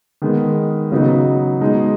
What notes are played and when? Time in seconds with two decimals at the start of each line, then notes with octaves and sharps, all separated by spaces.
0.22 D#3 G#3 B3
0.92 C#3 F#3 B3 D#4
1.61 B2 G#3 D#4